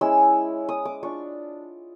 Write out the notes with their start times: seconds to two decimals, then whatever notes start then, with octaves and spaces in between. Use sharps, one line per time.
0.01 G#3 C#4 E4 E6
0.69 D#6
0.85 D6
1.03 D4 F4 C#6